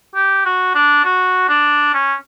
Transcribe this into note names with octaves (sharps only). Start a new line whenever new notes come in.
G4
F#4
D4
F#4
D4
C#4